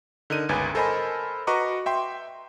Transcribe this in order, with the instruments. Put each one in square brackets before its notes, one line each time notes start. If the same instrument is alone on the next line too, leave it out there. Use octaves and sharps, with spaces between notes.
[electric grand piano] D3 D#4 A#4 D#7
G1 C#2 B4 G#5
A4 A#4 C5 D#5 G#5 B5
F#4 B4 D#5 A#5 C#6 D6
E5 G5 C6